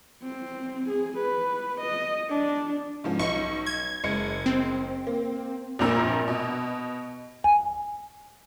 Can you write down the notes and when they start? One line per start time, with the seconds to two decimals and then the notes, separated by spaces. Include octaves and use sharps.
0.22 C4
0.89 G#4
1.18 B4
1.81 D#5
2.29 D4
3.04 G#2 F3 C#4
3.19 B1 D#4 C#6
3.66 G#6
4.04 F#1 G#3 C#7
4.46 C4
5.07 A#3
5.79 A#1 G2 A#2 C4 A#4 E6
6.28 B2
7.44 G#5